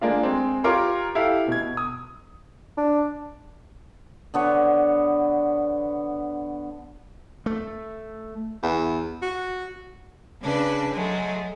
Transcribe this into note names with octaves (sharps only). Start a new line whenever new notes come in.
G#3 A#3 D4 F4
G#3 C4
F4 G4 A#4 C#5 C6 D6
E4 G4 A4 F5
B2 G#6
D#6
D4
D3 B3 C#5
A3
E2
F#4
C#3 D4 B4
F#3 G#3 A3